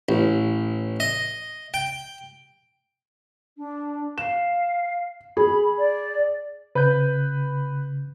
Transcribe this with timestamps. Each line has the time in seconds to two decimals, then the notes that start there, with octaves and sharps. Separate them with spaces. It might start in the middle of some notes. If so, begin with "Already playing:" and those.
0.09 A1
1.00 D#5
1.74 G5
3.57 D4
4.18 F5 E7
5.37 G#4 B5
5.78 D5
6.75 C#3 B4 G6